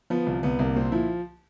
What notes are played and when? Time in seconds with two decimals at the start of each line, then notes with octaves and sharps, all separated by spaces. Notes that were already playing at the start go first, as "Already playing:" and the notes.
0.10 F3 B3
0.26 C2
0.43 C2 B3
0.59 C2 A#3
0.75 A#2 C4
0.92 F3 E4